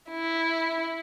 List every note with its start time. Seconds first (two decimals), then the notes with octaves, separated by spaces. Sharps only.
0.10 E4